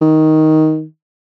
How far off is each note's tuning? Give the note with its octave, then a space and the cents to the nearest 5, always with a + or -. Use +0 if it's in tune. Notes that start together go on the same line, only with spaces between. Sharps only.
D#3 +10